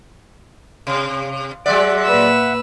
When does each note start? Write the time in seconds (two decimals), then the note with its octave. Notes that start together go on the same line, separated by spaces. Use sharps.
0.87 C3
1.66 F#3 G#3 D5 E5 F#5
2.05 A#2 B4 E6